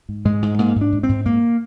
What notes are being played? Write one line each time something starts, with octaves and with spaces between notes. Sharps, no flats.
G#2
G#2 G#3
G#2
G#2 A#3
G#2
D4
G#2
C4
G#2
G#2 A#3